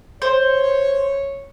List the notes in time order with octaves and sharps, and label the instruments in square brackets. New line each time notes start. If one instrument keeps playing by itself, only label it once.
[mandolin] C5 [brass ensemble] C#5